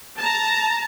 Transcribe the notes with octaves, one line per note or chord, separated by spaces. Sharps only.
A5 A#5